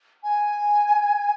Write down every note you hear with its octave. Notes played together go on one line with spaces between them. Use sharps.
G#5